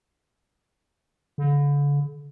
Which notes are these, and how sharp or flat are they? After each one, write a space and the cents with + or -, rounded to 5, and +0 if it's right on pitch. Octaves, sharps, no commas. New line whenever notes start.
D3 -40